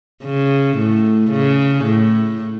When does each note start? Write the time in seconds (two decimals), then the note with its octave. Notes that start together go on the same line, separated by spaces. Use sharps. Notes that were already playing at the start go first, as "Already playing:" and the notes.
0.24 C#3
0.78 A2
1.31 C#3
1.85 A2